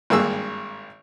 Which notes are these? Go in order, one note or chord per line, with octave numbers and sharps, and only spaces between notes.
G#1 G2 A#3 G#4 E6